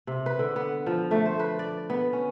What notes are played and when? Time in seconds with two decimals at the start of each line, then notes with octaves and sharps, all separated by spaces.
0.07 C3
0.26 B4
0.39 D3
0.56 B3
0.86 F3
1.11 A3
1.26 C5
1.40 B4
1.59 D5
1.90 B3
2.13 C#4